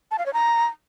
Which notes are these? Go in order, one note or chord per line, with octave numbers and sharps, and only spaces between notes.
A5
F5
C#5
A#5